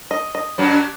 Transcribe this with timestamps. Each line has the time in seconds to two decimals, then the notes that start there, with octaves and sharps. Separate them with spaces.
0.11 D#5
0.35 D#5
0.58 F#2 F#3 D4